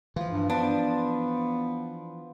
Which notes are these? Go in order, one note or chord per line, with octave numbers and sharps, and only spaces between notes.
E3 F3 F4
G2
B3 D4 B4 C5